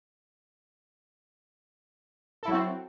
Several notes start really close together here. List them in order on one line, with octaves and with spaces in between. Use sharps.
A4 E4 F#3 F#4 C4